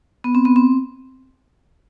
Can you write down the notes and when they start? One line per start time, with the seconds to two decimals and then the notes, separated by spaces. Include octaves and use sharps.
0.24 B3
0.35 C4
0.45 B3
0.56 C4